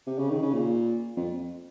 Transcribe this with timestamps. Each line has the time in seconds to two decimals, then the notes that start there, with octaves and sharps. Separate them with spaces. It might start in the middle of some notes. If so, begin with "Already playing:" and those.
0.07 C3
0.19 C#3
0.30 D#3
0.42 C#3
0.54 A#2
1.17 F2